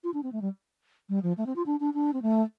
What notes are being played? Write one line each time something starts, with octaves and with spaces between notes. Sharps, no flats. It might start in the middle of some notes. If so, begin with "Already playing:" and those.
F4
D4
C4
A3
G3
G3
F3
A3
C4
F4
D4
D4
D4
C4
A3